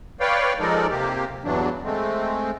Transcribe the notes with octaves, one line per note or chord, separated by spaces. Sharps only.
B4 C#5 D5 F5 G5
F3 G#3 D#4 A4 A#4 D5
C3 A#3 G4
E2 G2 E3 F#3 D4
G#3 A3 C4